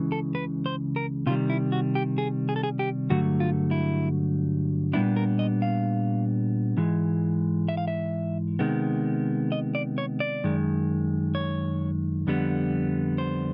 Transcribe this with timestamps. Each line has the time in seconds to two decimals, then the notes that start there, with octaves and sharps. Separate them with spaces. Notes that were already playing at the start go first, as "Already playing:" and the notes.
Already playing: C#2 C#3 E3
0.12 A4
0.35 B4
0.66 C5
0.96 A#4
1.26 C3 D#3 G3 F4
1.50 E4
1.72 F#4
1.95 G4
2.18 G#4
2.49 G#4
2.56 A4
2.63 G#4
2.79 G4
3.10 G2 D3 F#3 A3 F#4
3.40 F4
3.71 E4
4.93 A#2 G3 B3 D4 E4
5.16 A#4
5.39 D#5
5.62 F5
6.77 G#2 E3 G#3
7.69 E5
7.77 F5
7.88 E5
8.59 C3 D#3 G#3 B3
9.52 D#5
9.75 D5
9.98 C#5
10.20 D5
10.44 F#2 D#3 G#3
11.35 C#5
12.27 F2 D3 G3 B3
13.18 C5